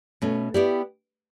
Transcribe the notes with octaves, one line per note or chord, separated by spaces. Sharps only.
B2 A3 C#4
B3 E4 G4 D5